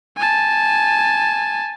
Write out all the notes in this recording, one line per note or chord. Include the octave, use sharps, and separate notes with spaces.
G#5 A5